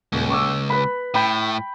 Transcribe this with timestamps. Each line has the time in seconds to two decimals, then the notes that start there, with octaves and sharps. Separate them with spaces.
0.12 D#1 C#2
0.30 C#6 D6 E6
0.70 B4 B5
1.14 A2 G5 B5 G6